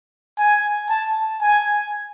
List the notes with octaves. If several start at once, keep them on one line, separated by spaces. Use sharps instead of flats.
G#5
A5
G#5